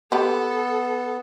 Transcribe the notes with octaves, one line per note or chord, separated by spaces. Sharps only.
B3 G4 A4 B4